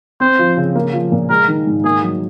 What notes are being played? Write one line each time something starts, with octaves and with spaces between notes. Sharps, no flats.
C4 C5
F3
C#3
A#3
F3
A#2
G#3 A#4
D#3
G#2
A#3 G#4
F#3